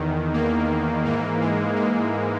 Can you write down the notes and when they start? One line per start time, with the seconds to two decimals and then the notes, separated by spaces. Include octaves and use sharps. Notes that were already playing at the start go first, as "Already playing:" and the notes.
Already playing: E2 D#3
0.33 A#3
1.05 G#2 E3 A#3
1.41 G#3
1.76 A#3